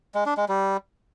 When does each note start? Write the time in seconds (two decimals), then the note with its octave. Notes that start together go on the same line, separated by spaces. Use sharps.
0.15 G#3
0.26 D4
0.37 G#3
0.49 G3